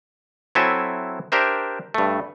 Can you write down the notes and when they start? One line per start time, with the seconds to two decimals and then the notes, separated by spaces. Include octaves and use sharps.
0.55 F#3 C4 E4 A4 E5 G#5
1.32 D4 G4 A#4 C5 E5
1.94 G2 A3